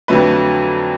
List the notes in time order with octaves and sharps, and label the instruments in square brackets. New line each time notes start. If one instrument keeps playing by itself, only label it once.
[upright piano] F2 D3 F#3 A3 B4